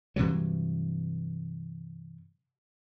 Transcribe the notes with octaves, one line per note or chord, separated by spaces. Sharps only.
G2 C3 E3 F#3